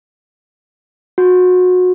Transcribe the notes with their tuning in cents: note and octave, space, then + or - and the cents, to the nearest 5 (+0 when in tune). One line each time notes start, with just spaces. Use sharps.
F#4 -25